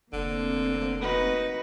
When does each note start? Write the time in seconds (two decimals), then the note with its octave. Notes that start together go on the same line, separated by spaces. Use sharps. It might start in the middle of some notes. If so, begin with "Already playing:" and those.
0.13 F1 D3 A3 A#3 C4
1.01 D#4 F#4 B4